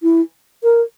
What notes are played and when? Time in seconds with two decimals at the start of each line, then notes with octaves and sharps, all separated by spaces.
0.03 E4
0.63 A#4